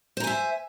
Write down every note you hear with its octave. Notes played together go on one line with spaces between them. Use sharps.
C5 E5 G#5 A#5